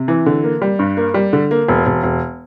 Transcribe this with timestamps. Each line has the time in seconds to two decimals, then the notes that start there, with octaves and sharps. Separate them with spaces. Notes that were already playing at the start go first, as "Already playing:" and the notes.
Already playing: C3
0.08 E3
0.26 D3
0.44 A#3
0.62 G3
0.79 G2
0.97 A#3
1.14 G3
1.33 D3
1.51 A#3
1.68 E1
1.86 E1
2.03 E1